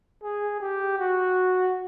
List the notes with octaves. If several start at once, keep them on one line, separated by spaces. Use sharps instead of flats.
G#4
G4
F#4